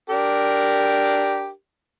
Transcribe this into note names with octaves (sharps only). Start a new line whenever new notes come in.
D4 G4 A#4